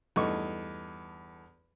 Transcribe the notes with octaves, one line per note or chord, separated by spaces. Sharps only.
E2 G2 A3 D#4 C#6